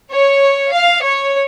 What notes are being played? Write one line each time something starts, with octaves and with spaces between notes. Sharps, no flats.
C#5
F5
C#5